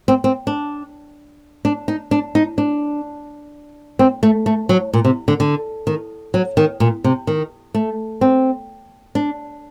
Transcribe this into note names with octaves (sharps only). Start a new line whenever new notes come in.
C4
C4
D4
D4
D#4
D4
D#4
D4
C4
A3
A3
F#3
A#2
C3
D3
D3
D#3
F#3
D#3
A#2
C3
D#3
A3
C4
D4